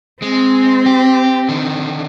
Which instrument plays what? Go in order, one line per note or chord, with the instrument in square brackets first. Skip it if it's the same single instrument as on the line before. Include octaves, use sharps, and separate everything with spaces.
[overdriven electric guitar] G#3 [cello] C4
[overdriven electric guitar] G4
D3 D#3